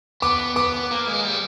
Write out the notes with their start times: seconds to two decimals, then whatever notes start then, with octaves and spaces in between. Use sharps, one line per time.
0.22 B3 D6
0.56 B3 D6
0.91 A#3
1.07 G#3
1.24 G3